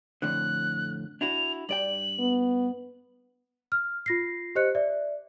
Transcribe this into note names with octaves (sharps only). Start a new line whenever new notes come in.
F2 A2 D3 F#6
D4 E4 F#4 F7
G2 D5 G5 F#7
B3
F6
F4 A#6 C7
G4 C5 D#5 F#6 C#7
D5 E5